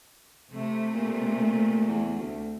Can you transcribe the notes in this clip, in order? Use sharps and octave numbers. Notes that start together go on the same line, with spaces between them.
C3 A3
A#2
E2
D2